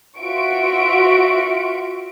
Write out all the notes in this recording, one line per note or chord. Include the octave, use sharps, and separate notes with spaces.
F4 F#4 E5 C#6 D7